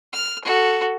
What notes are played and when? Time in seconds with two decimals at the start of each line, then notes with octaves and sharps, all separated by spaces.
0.13 F6
0.44 F#4 A4